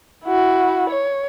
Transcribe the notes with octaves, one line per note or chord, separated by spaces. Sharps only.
E4 F#4
C#5